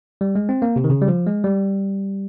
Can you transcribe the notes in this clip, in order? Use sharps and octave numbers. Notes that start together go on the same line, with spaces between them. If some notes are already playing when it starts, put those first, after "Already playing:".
G3
G#3
C4
A#3
C3
D#3
C#3
G3
F3
G#3
G3